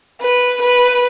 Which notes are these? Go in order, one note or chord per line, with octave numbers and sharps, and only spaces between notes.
B4
B4